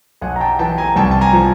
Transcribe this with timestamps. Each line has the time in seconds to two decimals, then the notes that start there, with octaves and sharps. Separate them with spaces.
0.21 B1 F#5 G#5
0.36 A#5
0.40 G5 A5
0.59 E3 G5 A5
0.78 G#5 A#5
0.96 C2 G5 A5
1.11 A5
1.21 G#5 A#5
1.33 F3